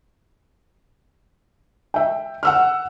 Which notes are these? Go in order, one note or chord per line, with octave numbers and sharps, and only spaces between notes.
E5 G5
F#5 E6 F6